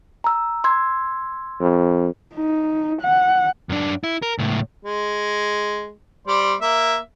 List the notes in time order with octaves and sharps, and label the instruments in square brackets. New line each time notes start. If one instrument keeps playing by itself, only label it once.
[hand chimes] A#5 E6
C6 E6 G#6
[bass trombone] F2
[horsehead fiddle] D#4
F#5
[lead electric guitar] F#2 D4
E4
A#4
C#2 A2
[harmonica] G#3
G3 C5 D5
A#3 E5